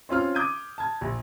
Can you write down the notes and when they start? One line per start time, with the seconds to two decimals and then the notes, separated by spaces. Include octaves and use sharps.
0.09 C4 C#4 F4 F6
0.35 D6 D#6 G6 G#6 D#7
0.78 A5 G#6
1.01 A#1